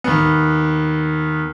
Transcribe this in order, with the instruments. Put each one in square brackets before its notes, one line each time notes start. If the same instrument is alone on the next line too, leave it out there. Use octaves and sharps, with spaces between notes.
[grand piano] D#2 B3